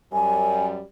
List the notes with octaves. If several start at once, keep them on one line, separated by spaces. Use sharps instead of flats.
F#2 G3 G#5